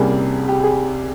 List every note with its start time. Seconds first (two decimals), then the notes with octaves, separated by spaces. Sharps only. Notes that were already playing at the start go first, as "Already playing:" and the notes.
Already playing: C2 C3 G3 A#3 C#4 G#4
0.48 G4
0.63 G#4